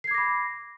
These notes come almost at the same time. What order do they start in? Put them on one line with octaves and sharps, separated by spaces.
C7 G#6 D6 A#6 B5